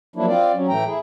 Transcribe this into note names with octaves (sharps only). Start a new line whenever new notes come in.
F3 F#3 A#3 D4 E4
C4 F4 D5
F#3 C#4
A2 E3 A3 G5 A#5
E4 G#4